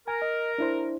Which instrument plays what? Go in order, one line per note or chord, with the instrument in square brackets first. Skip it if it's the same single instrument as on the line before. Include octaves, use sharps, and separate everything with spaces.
[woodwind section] A#4 [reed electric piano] G#5
[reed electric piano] D#5
D4 E4 C5